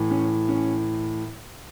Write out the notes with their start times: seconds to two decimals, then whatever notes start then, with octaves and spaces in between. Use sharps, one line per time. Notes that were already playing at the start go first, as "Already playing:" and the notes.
Already playing: A2 E3
0.11 C#4
0.49 C#4